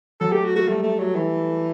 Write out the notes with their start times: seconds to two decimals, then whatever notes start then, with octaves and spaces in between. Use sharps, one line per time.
0.20 F#3 A4
0.32 A3 G4
0.45 F#4
0.56 A3 F#4
0.67 G3 A3
0.83 A3
0.99 F#3
1.15 E3